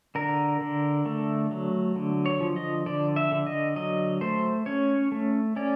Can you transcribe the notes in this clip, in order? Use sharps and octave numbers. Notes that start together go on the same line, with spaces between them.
D3 A#4
D3
A3
F#3
D3
C#5
F3
D#5
D3 D5
E5
D3
D#5
F#3 D#5
A3 C5
C#4 C#5
A3
C#4 D5